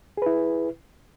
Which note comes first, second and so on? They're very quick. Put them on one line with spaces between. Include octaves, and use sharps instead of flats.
G#4 B4 E4